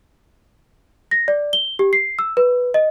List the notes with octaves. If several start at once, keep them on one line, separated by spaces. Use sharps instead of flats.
A#6
D5
G7
G4
C7
E6
B4
D#5